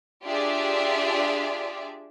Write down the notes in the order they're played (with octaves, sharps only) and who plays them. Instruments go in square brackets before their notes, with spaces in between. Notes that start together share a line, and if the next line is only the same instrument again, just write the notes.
[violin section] D4 F4 G4 G#4 D5 E5